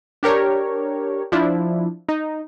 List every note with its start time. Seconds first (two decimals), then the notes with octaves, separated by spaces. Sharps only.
0.23 D4 G4 A#4 C#5
1.32 F3 D4 E4
2.09 D#4